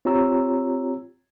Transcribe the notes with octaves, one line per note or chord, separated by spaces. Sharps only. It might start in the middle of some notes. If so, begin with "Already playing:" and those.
C4 F4 G4 C#5 A#5 E6